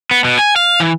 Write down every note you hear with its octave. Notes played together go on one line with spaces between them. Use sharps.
B3
B2
G#5
F5
E3